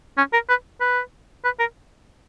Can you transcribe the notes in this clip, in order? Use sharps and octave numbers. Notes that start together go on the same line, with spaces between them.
C#4
A#4
B4
B4
B4
A#4